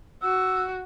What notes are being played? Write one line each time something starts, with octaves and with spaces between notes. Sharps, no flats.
F#4 E6